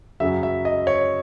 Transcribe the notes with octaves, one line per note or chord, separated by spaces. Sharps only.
F#2 C#3 F#3 E5
E5
D#5
C#5